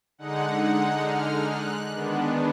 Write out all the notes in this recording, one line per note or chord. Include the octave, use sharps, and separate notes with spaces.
D3 G#3 D#4 F#5
F#5
F6
F#6
D#3 G#3 B3 D4